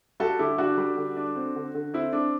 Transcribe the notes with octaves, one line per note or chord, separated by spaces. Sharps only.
G3 F#4 A4
D3 E4 G4
G3 D4 F#4
G3
D3
D4
C4
D3
D3
C4 E4
C4 D4